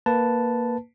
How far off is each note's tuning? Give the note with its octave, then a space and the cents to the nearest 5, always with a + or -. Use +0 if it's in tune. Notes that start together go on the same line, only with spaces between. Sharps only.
A#3 +0 B4 +0 A5 +0